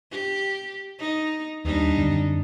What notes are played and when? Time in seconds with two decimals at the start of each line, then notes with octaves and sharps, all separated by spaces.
0.11 G4
0.99 D#4
1.65 D#2 G3 D4 D#4
1.97 F#2 D3 C4